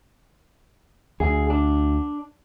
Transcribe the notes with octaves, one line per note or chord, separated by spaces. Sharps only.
D2 G#4
D4